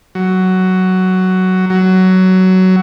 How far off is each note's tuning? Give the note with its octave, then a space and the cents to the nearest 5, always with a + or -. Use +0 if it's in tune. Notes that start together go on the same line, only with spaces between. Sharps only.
F#3 +10
F#3 +15